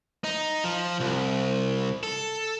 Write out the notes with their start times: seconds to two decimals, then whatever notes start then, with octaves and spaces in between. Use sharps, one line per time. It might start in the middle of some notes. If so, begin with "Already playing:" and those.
0.24 D#4
0.64 F3
1.00 C2
2.03 A4